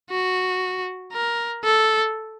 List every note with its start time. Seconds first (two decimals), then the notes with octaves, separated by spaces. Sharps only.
0.10 F#4
1.13 A#4
1.64 A4